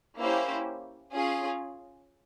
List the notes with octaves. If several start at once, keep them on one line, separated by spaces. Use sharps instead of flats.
A#3 C#4 E4 G4 C5
C#4 F4 G#4